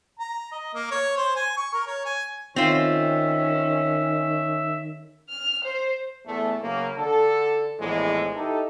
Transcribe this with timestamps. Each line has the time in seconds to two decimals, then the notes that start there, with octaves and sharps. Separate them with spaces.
0.19 A#5
0.52 D#5
0.74 A#3
0.91 C#5
1.17 C5
1.36 G#5
1.57 C#6
1.74 A#4
1.87 C#5
2.06 G#5
2.56 D#3 C4 C#4 F4 E5
5.29 F6
5.64 C5
6.26 E2 A3
6.62 C#3 F#3 A#3
6.96 D3 A4
7.78 A#1 E2 A2 E3 G#3
8.36 D#4 E4 G4 A4